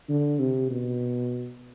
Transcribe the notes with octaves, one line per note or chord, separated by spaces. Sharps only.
D3
C3
B2